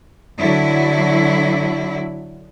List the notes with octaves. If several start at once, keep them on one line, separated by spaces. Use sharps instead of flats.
D3 F#3 E4